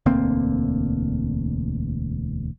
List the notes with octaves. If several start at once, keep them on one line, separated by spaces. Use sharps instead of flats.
E1 D2 A#3 C4